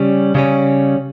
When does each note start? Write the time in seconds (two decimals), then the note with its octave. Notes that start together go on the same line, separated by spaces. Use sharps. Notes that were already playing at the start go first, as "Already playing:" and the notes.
Already playing: C#3 G3 C#4
0.35 C#3 G3 C#4